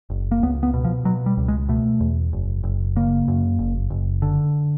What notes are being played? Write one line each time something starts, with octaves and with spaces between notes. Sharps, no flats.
F#1
A#3
C#2 B3
B3
B2
F3
B2 F#3
G3
C#2
G#3
B2 A3
E2
F#1
F#1
C#3 A#3
F#2
F#1
F#1
D3